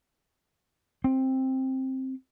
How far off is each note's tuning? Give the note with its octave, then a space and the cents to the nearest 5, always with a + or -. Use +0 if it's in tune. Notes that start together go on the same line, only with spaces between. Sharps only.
C4 +10